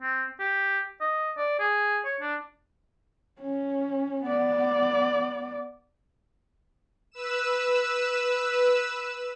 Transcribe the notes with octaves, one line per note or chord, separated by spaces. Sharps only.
C4
G4
D#5
D5
G#4
C#5
D4
C#4
B3 D5
B4 E6 E7